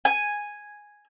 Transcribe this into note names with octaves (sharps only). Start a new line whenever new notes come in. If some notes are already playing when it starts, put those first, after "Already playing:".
G#5